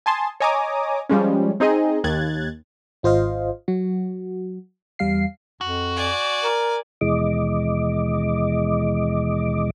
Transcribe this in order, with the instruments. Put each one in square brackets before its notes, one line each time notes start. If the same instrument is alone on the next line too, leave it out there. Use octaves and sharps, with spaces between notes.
[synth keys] G#5 A5 C6 D#6
C#5 D#5 G#5 A#5 D6 D#6
F3 G3 G#3 C#4
C4 D#4 G#4 D#5
D#2 F#6 G#6 A6
[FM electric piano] G#1 F4 C5 D#5 F5
F#3 F#4
E2 G3 F5 C7
[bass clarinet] F2 [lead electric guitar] F#4
[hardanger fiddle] D5 G#5
[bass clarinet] A#4
[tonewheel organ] D#2 B2 E3 G#3 D#5 D6